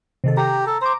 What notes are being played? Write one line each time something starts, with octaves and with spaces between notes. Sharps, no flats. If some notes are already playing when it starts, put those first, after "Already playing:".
C3 D#3 A4
G4 A#5
A4
C5 A#5 D6